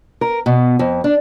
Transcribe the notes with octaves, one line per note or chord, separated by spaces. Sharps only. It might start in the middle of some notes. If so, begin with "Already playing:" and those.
A#4
B2
F2
D4